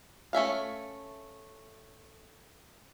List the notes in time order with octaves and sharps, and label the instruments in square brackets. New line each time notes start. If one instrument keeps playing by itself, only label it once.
[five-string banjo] A3 C#4 E5 F5